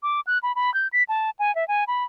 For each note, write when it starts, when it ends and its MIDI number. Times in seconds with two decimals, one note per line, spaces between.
0.03 0.21 86
0.27 0.38 90
0.43 0.52 83
0.56 0.73 83
0.74 0.88 91
0.93 1.03 95
1.09 1.30 81
1.39 1.54 80
1.55 1.67 76
1.68 1.84 80
1.88 2.04 83